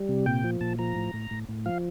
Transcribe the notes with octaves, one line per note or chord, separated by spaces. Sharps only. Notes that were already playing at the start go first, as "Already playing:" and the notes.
Already playing: G3
C3
A#2 G5
F3
A#2 A5
F3 A#5
A2
A2
A2
A2
F3 F5